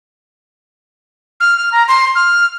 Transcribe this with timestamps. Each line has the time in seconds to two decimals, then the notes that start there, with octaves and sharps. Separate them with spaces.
1.40 F6
1.57 F6
1.72 A#5
1.88 C6
2.16 F6